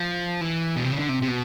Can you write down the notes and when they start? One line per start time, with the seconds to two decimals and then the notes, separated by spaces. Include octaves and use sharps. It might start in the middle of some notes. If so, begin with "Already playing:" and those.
Already playing: F3
0.41 E3
0.76 B2
0.84 C3
0.92 C#3
0.99 D3
1.09 C3
1.22 C3
1.28 B2